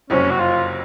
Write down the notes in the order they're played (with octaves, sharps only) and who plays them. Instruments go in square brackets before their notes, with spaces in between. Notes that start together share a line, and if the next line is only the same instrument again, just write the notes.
[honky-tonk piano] F#1 F2 C3 F#3 C4 [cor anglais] C#4
[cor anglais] F#4
F4